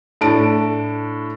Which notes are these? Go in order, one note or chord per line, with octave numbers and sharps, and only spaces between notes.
A2 D4 A5 D7